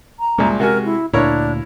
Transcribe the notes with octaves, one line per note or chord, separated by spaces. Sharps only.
A#5
C2 A#2 G#3
C3 F#4 A#4 G#5
E4
D2 A#2 D4 E4 A#4 C#5